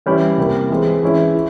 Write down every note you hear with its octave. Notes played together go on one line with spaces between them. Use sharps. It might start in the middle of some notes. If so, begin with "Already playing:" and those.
E3 G3 C#4 E4
C3 G3 A#3
E3 G#3 C4
E3 G#3 C#4 E4
E4